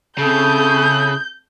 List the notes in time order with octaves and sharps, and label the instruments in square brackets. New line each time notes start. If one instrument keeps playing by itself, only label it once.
[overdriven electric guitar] C#3 [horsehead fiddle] C4 A4 [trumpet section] E4 A5 D#6 [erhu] G6